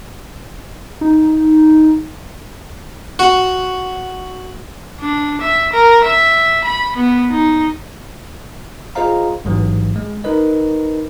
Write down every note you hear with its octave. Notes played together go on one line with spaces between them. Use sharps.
D#4
F#4
D4
E5
A#4
E5
B5
B3
D#4
F4 G#4 C5 D#5 F5 A#5
A1 G#2 E3 F#3
G#3
D#4 A#4 B4 D#5